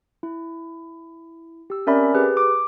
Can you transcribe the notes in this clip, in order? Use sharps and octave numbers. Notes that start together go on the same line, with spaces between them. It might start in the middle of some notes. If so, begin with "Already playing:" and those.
E4
G4 E6
C4 C#4 A#4 D5 E5 B5
G4 G#4 B4
D6